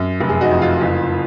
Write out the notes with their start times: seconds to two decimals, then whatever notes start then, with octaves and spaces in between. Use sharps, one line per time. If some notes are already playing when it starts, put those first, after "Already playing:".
Already playing: F#2
0.20 F1
0.29 G#4
0.41 D#4 F#4
0.51 F2
0.62 F4
0.81 F#1